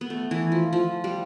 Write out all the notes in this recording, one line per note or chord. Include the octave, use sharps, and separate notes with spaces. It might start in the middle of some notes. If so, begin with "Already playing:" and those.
B3
A3
E3
F3
F3
G3